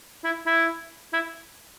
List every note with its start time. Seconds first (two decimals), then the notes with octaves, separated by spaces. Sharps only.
0.24 E4
0.47 E4
1.14 E4